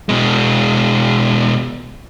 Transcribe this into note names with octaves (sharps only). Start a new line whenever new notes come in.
B2 G#3